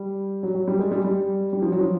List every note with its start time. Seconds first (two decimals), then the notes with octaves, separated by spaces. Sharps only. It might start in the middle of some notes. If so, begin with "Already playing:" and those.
Already playing: G3
0.43 F#3
0.55 F#3
0.68 G3
0.79 G#3
0.91 G3
1.05 G3
1.53 G3
1.62 F3
1.72 F#3
1.81 F3